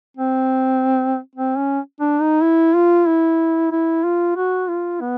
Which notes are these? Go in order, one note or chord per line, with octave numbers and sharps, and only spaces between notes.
C4
C4
C#4
D4
D#4
E4
F4
E4
E4
F4
F#4
F4
B3